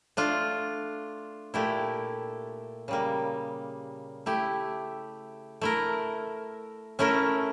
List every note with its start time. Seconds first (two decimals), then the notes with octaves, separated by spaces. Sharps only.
0.17 A3 D4 F4
1.54 A#2 A3 E4 G4
2.88 C#3 G3 A#3
4.26 A3 E4 G4
5.61 A3 E4 A#4
6.99 A3 C#4 E4 A#4